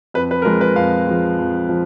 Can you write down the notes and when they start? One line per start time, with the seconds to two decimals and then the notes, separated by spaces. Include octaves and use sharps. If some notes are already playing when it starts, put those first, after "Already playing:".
0.14 F2 B4
0.31 B4
0.42 A#4
0.45 F3 G#3 B4
0.61 B4
0.76 F2 F5
1.07 F3 G#3
1.39 F2
1.69 F3